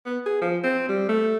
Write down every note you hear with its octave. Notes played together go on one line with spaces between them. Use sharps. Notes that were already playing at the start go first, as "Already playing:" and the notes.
B3
G#4
F3
C4
G3
A3